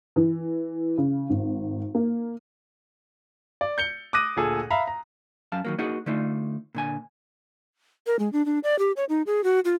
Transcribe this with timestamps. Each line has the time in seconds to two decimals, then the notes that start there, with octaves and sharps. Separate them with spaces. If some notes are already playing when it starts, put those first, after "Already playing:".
0.16 E3
0.98 C#3
1.30 G#1
1.95 A#3
3.61 D5
3.78 G6 C#7 G7
4.13 D6 D#6 F#6 A#6 D#7
4.36 D2 A#2 G#4 A4
4.71 E5 F5 A#5 B5
4.87 A#5
5.52 F#2 F5 A5
5.65 D#3 F#3 A#3
5.78 A#3 D#4 F#4 G#4 D#5 F#5
6.06 D3 A3 D#4 F4
6.75 A#2 D3 G#5
8.07 A#4
8.19 G#3
8.33 D4
8.46 D4
8.64 D5
8.79 G4
8.97 C#5
9.09 D#4
9.27 G#4
9.44 F#4
9.65 F4